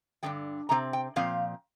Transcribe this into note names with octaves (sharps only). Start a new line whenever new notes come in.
G2 D3 F3 G5
C3 G3 C4 A#5
G5
A#2 F3 C4 F5